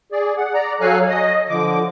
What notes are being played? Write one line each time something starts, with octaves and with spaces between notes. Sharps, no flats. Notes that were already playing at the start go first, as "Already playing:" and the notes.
G#4 D5
F#5
D5 A#5
F#3 A4 C#5 F5 G#5 F#6
D#5 D#6
D3 F3 D6